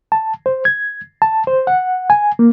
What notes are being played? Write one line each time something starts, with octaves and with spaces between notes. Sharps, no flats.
A5
C5
G#6
A5
C5
F#5
G#5
A#3